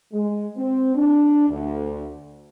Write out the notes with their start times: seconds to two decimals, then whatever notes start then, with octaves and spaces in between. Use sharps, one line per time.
0.13 G#3
0.57 C4
0.95 D4
1.49 D2